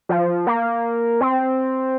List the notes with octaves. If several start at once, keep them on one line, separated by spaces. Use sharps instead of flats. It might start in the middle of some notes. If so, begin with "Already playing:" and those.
F3
A#3
C4